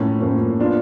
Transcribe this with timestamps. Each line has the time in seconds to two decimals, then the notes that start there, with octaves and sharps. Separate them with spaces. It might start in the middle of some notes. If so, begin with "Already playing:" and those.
Already playing: A2 F3 A#3 C#4
0.20 A2 F3 A#3 C#4
0.59 B3 D4 F4